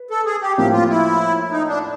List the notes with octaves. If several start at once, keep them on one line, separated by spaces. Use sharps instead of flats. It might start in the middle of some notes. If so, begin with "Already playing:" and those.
Already playing: B4
A4
G#4
G4
A2 F3 A#3 G4
F4
E4
D#4
D4